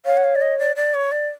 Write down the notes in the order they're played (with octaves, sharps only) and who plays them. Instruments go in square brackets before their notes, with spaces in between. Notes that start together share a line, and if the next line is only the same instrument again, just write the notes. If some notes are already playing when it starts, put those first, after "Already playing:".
[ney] C#5 [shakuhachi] F5
[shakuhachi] F#5
F5
D5
D#5
D5
D5
C#5
D5